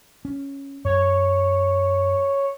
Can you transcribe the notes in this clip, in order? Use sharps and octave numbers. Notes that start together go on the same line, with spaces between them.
C#4
F#2 C#5